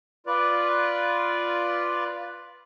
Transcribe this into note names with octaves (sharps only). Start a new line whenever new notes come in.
F4 B4 D5